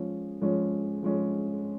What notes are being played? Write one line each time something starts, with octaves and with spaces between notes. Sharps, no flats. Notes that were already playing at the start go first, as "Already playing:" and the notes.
Already playing: F3 G#3 C#4
F3 G#3 C#4
F3 G#3 C#4